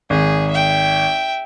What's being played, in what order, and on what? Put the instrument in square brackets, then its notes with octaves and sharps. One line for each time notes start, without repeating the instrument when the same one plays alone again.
[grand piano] G#1 [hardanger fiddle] G#4
[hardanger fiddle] E5 G5